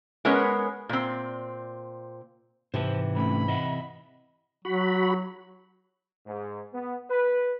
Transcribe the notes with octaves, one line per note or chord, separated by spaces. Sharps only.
G#3 B3 C#4 A#4 B4 C#5
A#2 C4
G#2 C3 E3 C5 A5
D3 A3 C#4 B5
D#5 E5 F#5
F#3 F#4 B5
G#2
B3
B4